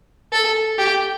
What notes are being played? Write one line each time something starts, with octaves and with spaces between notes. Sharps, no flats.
A4
G4